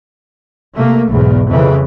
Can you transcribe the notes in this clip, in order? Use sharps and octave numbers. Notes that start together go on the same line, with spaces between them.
C3 A3 A#3
B1 E2 G#2
F2 C#3 E3